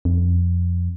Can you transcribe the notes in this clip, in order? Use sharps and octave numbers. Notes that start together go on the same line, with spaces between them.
F2